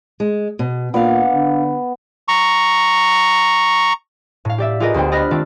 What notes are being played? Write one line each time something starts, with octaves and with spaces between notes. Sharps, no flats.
G#3
B2
A#2 B3 D4 F5
D3
A#5 C#6
A2 F5
G4 D5 E5
F4 G4 G#4 A#4 B4 D#5
D2 B3 C5 G5
D5 D#5 B5 F6 F#6 A#6
D#3 A3 C4 F4 D5